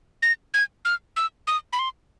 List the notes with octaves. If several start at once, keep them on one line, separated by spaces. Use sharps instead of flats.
A#6
G#6
F6
E6
D#6
B5
C6